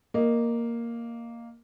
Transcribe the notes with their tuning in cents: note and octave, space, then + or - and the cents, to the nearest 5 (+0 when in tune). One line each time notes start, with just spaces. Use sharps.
A#3 +0 D#5 -15